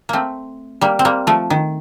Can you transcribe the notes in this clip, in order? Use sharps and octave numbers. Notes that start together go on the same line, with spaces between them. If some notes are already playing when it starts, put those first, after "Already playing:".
A3 A#3 C4
G3 A#3
C4
G3 A#3
F3 A3
D#3